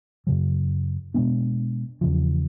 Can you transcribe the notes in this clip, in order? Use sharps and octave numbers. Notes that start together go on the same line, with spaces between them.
F#2 C#3 F#3
B2 G#3 B3 D4
E2 C#3 F3